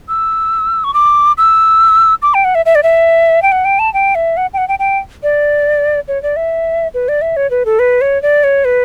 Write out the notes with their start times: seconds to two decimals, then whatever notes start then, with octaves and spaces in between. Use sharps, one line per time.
0.09 E6
0.84 C#6
0.94 D6
1.38 E6
2.22 D6
2.34 G5
2.45 F#5
2.55 E5
2.66 E5
2.75 D5
2.83 E5
3.43 G5
3.52 F#5
3.65 G5
3.79 A5
3.94 G5
4.15 E5
4.37 F#5
4.54 G5
4.58 F#5
4.68 G5
4.79 G5
5.23 D5
6.08 C#5
6.23 D5
6.36 E5
6.94 B4
7.08 D5
7.22 E5
7.37 C#5
7.50 B4
7.65 A4
7.79 B4
8.01 C#5
8.22 D5
8.44 C#5
8.65 B4